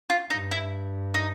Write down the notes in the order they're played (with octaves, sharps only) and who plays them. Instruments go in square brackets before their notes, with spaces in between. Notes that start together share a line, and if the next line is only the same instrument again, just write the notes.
[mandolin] F4
[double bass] G2 [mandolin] D#4
[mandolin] E4
D#4